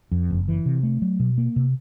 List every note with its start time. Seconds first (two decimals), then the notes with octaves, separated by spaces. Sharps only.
0.12 F2
0.30 F#1
0.48 E3
0.66 C3
0.83 A3
1.02 F#3
1.20 B2
1.38 A#3
1.56 C3